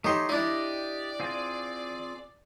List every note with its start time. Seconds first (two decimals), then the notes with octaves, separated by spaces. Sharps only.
0.04 A3 D#4 G4 C#5 C6
0.29 D4 E4 G4 D5 D#5
1.20 C4 F4 G#4